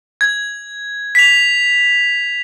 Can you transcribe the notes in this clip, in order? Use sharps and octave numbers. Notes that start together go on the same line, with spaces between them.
G#6
B6 F7